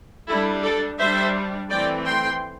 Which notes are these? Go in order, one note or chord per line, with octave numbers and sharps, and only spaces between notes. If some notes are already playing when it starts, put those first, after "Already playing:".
G3 D4 E4 A4
A4 D5
G3 D4 C5 E5
E3 A3 C4 D5 G5
G5 C6